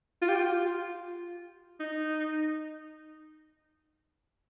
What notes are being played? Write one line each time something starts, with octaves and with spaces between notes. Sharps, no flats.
F4
G4
F4
D#4